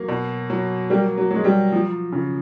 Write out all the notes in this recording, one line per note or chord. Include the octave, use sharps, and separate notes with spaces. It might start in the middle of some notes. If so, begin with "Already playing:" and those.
Already playing: F#3 A#3
B2
F#3
G3 A#3
F#3
F#3 G#3
G3
F3
C#3